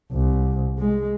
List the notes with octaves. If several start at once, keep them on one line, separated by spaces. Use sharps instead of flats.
C2
G#3